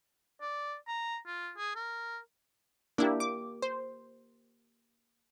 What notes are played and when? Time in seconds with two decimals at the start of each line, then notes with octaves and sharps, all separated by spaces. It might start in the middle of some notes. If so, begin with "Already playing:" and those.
0.41 D5
0.88 A#5
1.26 F4
1.57 G#4
1.76 A#4
2.98 A#3 D4 E4 G4
3.20 D6
3.62 C5